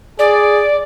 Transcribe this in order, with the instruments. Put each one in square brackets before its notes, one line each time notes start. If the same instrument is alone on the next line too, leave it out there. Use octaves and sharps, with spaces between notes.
[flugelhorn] G#4 [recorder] D5